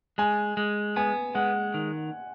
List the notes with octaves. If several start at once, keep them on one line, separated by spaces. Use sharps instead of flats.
G#3 G#5
G#3
B3 G#5
G#3 F#5
D#3